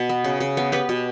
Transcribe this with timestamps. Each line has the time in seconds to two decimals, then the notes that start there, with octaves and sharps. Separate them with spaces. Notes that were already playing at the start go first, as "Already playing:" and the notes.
Already playing: B2
0.09 B3
0.24 C#3
0.40 C#3
0.57 B3
0.72 B3 G4 B4
0.89 B2